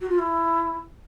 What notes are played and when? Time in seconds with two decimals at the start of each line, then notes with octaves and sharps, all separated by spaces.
0.01 F#4
0.09 F4
0.19 E4